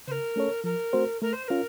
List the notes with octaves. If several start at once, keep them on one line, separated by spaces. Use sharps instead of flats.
C#3 A#4 C5
A3 C#4 A4 C#5
F3 A#4
A3 C4 F#4 C5
A3 A#4
C5
C5
C#4 F4 A#4